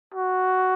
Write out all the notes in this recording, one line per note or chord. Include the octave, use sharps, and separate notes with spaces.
F#4